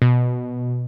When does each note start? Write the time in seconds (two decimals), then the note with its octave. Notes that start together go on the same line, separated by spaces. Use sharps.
0.02 B2